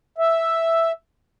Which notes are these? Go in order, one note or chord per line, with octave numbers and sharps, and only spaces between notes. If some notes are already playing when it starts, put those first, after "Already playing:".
E5